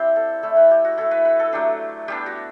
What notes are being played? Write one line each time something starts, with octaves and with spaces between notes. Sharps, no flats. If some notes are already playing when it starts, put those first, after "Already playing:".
Already playing: C4 D4 E4 G4
A4
A3 E4 A4
B4
G4
F#4
A3 E4 A4
B4
B4
A4
F#3 A3 D4 G4
G3 B3 D4 G4
F#4